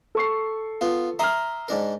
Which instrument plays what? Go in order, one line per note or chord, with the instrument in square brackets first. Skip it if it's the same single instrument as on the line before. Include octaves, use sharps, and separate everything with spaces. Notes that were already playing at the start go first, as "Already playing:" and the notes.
[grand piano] A4 C#6 C7
[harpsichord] B3 F4
[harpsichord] E5 C6 D#6 [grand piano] A#5 F6
[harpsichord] G#2 D4 A#4